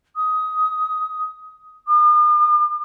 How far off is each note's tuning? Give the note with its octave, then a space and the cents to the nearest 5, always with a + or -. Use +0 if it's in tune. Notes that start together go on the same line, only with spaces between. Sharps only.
D#6 +15
D#6 -45